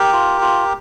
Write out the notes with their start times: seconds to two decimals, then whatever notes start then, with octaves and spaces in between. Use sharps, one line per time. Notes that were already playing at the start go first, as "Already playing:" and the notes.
Already playing: G4 A#4
0.13 F4
0.41 F4